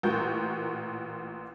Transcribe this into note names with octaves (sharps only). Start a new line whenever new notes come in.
A1 A#2 A#3 F#4 A#4 G6